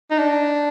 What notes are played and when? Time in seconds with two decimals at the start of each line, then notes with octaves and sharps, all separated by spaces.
0.11 D#4
0.18 D4